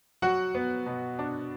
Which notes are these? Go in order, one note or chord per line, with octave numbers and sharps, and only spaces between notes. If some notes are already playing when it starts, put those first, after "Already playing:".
F#3 F#4 F#5
B3
B2
D4